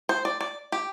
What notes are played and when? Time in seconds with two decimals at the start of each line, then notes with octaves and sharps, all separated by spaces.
0.09 C5
0.25 D5
0.41 D5
0.72 G4